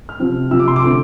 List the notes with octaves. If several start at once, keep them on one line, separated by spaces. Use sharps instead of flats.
F6
C3 F3 C4
C3 F3 C4 E6
D6
C6
D6
D3 A3 C4